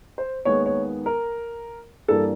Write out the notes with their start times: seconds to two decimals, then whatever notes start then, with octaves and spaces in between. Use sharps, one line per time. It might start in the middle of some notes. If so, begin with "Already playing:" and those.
0.18 C5
0.45 D#2 D#3 G#3 B3 C#5
0.66 C#5
1.06 A#4
2.08 G2 E3 G3 A#3 A4